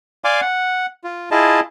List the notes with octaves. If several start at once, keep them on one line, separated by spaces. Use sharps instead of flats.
D5 F5 G#5 C6 D6
F#5
F4
E4 F4 G#4 D#5 A5